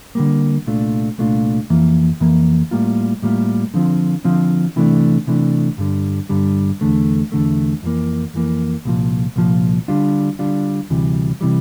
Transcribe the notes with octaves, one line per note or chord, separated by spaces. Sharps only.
D3 G3 A#3
C2 A#2 A3 D4 F4
C2 A#2 A3 D4 F4
F2 E3 A#3
F2 E3 A#3
A2 G3 A#3 F4
A2 G3 A#3 F4
D3 F3 C4 F4
D3 F3 C4 F4
C3 E3 A3 D4
C3 E3 A3 D4
G2 D3 G3
G2 D3 G3
E2 D3 A3
E2 D3 A3
F2 E3 A#3
F2 E3 A#3
C2 A#2 F3
C2 A#2 F3
D3 G3 D4 F4
D3 G3 D4 F4
D2 C3 E3 G3
C3 E3 G3